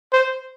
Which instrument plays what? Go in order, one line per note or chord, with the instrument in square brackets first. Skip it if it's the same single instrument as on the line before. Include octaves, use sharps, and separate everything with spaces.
[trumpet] C5